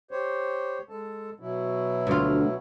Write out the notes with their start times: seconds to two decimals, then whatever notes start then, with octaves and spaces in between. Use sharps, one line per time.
0.11 G4 C5 C#5
0.89 G#3 A4 A5
1.40 B2 F#3 E4
2.07 D2 F4